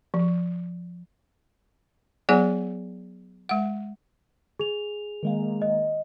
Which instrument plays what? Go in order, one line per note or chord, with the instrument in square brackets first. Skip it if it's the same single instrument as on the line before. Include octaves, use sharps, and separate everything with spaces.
[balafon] F3
F#3 B3 G#4 D5 F#5 G#5
G#3 F#5
[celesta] G#4 F7
[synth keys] D#3 G#3 A#3
[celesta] D#5